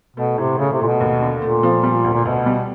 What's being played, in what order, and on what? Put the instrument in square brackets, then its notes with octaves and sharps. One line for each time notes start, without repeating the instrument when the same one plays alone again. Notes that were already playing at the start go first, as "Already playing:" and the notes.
[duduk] B2 [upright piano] A3
[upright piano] A2 [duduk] C3
[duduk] C#3 [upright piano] A3
[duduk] C3
[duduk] A#2 [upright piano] A3
[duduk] B2
[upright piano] D#2
D3
[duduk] A#2 [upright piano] A3
[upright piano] F3
G3
D2
[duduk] A#2
[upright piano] D2 [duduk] B2
[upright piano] G3